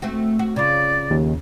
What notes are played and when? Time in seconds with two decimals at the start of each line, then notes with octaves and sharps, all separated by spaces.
0.02 A3 C4 F#4
0.39 F#4
0.56 C#3 F4 D5
1.11 D#2